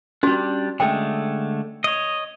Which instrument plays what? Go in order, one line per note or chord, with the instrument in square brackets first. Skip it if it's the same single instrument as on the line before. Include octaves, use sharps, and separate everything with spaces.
[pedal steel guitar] G3 D4 [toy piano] C#4 F#4
[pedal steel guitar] D3 G#3 A3 [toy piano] G5
[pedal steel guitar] C#5 D#5